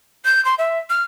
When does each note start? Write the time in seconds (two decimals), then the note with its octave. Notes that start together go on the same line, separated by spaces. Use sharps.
0.25 G6
0.45 C6
0.59 E5
0.90 F6